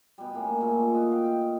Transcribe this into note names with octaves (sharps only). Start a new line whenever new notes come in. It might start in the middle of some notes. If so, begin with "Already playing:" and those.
B2 G3
A2 A#3 C#4
A#2 G#3 A3 C#6
F#4 D#5
F5 G5
G5